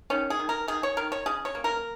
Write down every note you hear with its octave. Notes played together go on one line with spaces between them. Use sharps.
D#3 C#4
G#4
D#3
A#4
D#3 G#4
C#5
D#3 A#4
C#5
C#3 G#4
C#5
A#3
A#4